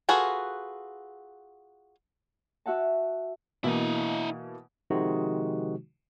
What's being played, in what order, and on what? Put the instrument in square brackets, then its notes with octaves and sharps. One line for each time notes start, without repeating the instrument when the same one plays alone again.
[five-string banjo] F4 F#4 G#4 A4 B4
[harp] F#4 E5 F#5 A5
[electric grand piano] B2 E3 A#3 [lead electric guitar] E4 D#5
[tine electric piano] C3 D#3 F3 G#3 D#4 F#4